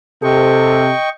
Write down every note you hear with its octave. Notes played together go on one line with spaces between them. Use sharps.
C3 A4 D#5 G5 C#6